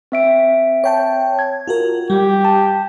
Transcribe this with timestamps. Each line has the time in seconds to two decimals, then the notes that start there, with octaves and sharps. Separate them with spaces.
0.12 C4 E5 D7
0.84 C#5 G5 A5
1.39 G#6
1.68 F4 F#4 A#4
2.10 G3 G4
2.45 A5